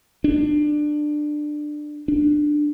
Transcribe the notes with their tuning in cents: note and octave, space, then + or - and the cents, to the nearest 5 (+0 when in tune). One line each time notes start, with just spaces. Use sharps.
D4 +20
D4 +15